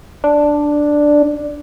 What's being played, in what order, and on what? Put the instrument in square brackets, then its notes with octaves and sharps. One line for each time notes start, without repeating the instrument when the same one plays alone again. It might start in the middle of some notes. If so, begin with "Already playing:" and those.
[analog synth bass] D4